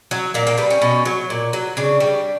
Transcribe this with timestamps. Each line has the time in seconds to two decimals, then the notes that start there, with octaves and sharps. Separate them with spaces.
0.11 F#3
0.34 A#2 A#3
0.47 A#3
0.57 G3 B3
0.70 C#4
0.82 B2
1.05 F#3
1.30 A#2
1.53 F#3
1.77 C#3 D4
2.00 G3